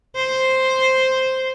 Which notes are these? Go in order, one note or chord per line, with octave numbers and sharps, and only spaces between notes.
C5